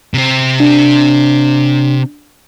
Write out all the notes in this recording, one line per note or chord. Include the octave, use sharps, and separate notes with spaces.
C3 C4
D4